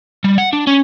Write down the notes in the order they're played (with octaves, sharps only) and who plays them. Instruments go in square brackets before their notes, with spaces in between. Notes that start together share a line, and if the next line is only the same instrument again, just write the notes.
[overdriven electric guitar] G3
F#5
D4
C#4